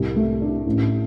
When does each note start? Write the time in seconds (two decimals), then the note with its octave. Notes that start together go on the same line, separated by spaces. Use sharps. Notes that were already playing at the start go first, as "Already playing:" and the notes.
Already playing: C2 G3 A#4
0.16 A3
0.41 D4
0.66 A1